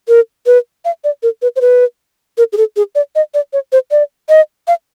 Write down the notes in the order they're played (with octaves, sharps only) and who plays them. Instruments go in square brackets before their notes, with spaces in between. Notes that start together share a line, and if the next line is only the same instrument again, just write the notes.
[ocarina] A#4
B4
F5
D5
A#4
B4
C5
B4
A#4
G#4
A4
G#4
D5
D#5
D5
C#5
C5
D5
D#5
F5